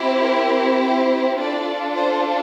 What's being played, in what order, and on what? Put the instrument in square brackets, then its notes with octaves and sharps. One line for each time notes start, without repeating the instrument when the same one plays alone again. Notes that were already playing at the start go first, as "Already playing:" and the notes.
Already playing: [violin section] C4 E4 G4
A#4
C5
D4 F4 A4 D5
C5